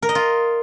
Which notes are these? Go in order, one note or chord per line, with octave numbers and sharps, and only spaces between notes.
A#4
D#5
F4